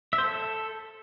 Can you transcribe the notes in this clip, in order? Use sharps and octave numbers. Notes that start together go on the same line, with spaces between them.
E5
C5
A4